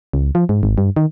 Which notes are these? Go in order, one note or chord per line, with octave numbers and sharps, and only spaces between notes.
C#2
F3
G#2
G#1
G2
D#3